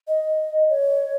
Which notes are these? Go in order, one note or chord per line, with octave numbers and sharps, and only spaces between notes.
D#5
C#5